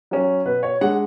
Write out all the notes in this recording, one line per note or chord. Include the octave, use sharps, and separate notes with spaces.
F#3 C#4
B2 B4
C#5
G#3 D4 F#5